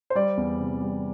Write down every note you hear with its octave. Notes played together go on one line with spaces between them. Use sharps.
C5
G3 D5
E2
C3
G3